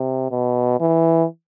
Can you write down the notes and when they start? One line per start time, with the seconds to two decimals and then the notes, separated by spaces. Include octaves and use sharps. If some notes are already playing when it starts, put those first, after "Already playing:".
Already playing: C3
0.31 B2
0.80 E3